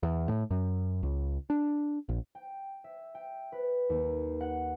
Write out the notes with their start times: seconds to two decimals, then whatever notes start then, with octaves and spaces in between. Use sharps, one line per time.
0.03 E2
0.28 A2
0.51 F#2
1.03 C#2
1.50 D4
2.09 A#1
2.35 G5
2.84 E5
3.15 G5
3.52 B4
3.89 D#2
4.41 F#5